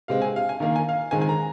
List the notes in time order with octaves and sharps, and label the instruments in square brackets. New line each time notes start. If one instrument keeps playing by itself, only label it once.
[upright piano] C3 G#3 C4 F5
G#5
F5
G#5
D#3 A#3 F5
G#5
F5
D#3 G#3 C4 G#5
G#5
A#5